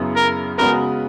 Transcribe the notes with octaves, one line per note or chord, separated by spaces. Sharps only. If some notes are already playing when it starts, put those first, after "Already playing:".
Already playing: F#2 C#3 F#3 B3 E4
A#4
C#3 G#3 B3 F#4 A#4 B4